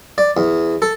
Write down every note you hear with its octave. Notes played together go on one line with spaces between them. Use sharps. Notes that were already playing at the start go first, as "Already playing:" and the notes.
D5
E2
A4